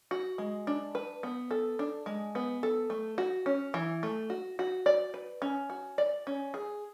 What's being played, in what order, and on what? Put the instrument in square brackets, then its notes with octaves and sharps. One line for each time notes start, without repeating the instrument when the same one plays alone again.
[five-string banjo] F#4
G#3
D4
B4
B3
A4
D4
G#3
B3
A4
A3
F#4
C#4
E3
A3
F#4
F#4
D5
B4
C#4
F#4
D5
C#4
G#4